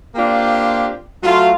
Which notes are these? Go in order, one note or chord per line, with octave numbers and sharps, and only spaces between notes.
A#3 C4 D4 F4 G4
F#3 A3 F4